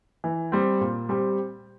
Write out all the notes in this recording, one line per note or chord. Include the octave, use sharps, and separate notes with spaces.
E3
G3 C4
A#2
G3 C4 G4